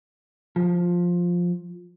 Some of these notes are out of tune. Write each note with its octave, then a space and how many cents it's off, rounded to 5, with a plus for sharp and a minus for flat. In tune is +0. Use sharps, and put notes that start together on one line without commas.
F3 +10